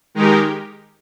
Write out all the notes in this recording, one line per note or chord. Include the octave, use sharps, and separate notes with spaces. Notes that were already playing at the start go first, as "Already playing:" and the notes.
D#3 G#3 D#4 G4 A#4